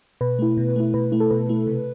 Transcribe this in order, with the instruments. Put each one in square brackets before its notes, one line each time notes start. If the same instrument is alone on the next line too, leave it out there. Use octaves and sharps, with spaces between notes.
[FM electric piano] B2 B4
A3 E4
B2
A3 E4
B2 B4
A3 E4
A4
B2 B4
A3 E4
C3